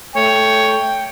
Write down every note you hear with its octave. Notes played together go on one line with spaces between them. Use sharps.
A3 C#5 G5